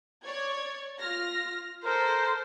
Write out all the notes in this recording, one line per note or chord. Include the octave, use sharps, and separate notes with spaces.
C#5 D5 G#6
F4 F6 A#6
A4 A#4 C5